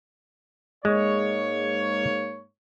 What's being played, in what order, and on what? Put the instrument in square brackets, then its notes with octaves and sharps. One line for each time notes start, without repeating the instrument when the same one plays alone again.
[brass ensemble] G#2 A#3 C#5 [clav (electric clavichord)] G#3